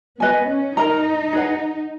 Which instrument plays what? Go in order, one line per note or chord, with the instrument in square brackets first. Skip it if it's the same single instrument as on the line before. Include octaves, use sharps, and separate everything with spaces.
[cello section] B3 [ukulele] B4 D#5 G#5
[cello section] C#4
[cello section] D#4 [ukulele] A#4 D#5 A#5
[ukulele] G#4 B4 D#5 F#5